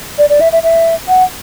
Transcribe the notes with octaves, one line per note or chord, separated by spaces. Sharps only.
D5
D5
E5
E5
E5
F#5